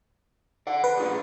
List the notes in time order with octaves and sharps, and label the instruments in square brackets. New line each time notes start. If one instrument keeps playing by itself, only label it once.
[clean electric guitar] D5 F#5
[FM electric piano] B4
[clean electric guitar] D4 F4 G#4